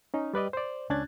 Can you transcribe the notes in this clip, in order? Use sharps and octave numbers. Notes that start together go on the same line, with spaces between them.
C#4 D#4
G3 B4 D5 D#5
C5 D5
C#2 C#4 D4 F#6 G#6 A6